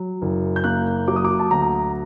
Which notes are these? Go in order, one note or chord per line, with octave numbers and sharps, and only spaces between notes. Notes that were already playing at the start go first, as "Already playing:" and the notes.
Already playing: F#3
F#1
G6
A#3 F#6
F#3 D6
D#6
D6
A5
D2 A#5